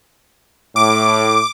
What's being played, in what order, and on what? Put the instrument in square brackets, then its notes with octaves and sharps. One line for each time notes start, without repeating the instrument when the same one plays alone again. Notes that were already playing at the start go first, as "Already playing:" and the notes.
[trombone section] A2 [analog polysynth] D6